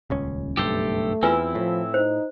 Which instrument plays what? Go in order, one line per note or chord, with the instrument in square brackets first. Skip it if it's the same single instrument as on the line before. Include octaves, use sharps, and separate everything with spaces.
[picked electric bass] D#1 C#2 C#4
[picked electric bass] F#1 B1 G2 [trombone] A3 [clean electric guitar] G4 A4 C5
[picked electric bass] E2 [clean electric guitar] C4 E4 [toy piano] F4 B4 G#5
[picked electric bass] A2 [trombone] F3
[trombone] D#4 [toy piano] C5